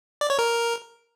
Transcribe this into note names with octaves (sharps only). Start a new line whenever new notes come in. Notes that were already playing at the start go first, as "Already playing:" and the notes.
D5
C#5
A#4